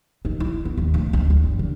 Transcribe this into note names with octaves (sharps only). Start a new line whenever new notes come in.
D#4
E4
B3
D#2
D2
D2
E2
G1
D3